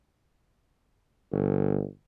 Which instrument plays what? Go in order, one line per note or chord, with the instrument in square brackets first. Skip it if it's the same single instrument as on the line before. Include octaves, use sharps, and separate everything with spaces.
[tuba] G1